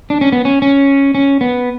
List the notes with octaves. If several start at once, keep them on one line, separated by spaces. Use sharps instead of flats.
D4
C#4
B3
C#4
C#4
C#4
B3